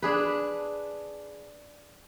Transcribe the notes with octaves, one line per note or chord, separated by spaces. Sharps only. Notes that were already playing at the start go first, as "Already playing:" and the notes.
D4 G#4 B4